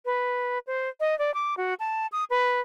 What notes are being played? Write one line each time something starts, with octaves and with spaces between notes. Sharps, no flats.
B4
C5
D#5
D5
D6
F#4
A5
D#6
B4